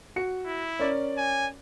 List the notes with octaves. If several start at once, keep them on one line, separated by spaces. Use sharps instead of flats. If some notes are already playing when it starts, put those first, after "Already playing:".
F#4 C#7
E4
C#4 A#4 D5
G#5